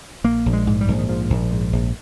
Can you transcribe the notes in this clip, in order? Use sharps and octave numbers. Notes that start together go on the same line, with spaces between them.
A#1 A#3
A#1
G#3
G#2
G3
A#1
D#3
G#2 F3
A#1
G#2
A#1